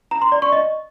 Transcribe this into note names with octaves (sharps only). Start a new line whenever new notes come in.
A#5
C6
D5
C#6
D#5